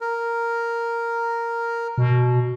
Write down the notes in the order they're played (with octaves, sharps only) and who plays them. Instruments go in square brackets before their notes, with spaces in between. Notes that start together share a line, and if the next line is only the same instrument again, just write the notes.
[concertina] A#4
[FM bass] B2